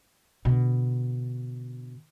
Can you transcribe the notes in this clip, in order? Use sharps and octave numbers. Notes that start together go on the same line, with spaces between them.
B2 D3